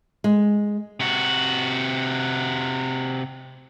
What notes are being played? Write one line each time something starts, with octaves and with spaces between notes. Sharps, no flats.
G#3
C3 F#4